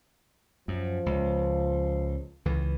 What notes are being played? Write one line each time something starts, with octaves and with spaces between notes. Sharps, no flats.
F#2 F3
C#2
C#2 E3